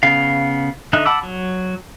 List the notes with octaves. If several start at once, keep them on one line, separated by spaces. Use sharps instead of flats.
C#3 B3 F5
D3 D#4 D#5 E5 F#6
F#5 A5 B5 D6 E6
F#3